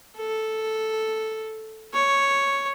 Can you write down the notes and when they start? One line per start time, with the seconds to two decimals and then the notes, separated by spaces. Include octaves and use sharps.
0.17 A4
1.93 C#5